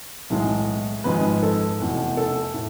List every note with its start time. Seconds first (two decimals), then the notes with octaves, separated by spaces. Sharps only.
0.30 B1 A2 E3 G#3
1.04 G#1 G#2 F3 G#3 B4
1.43 A4
1.79 F1 E2 B2
2.17 A4
2.54 A2